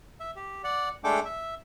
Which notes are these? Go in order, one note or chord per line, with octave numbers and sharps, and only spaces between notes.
E5
G4
D5 F#5
G#3 A3 D4 A4 G5 D6
E5